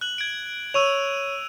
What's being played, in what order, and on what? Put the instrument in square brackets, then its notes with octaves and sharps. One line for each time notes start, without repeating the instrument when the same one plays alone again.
[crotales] F#6 F#7
G#6 D7
[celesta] C#5 C#6 [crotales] E6 D#7 F7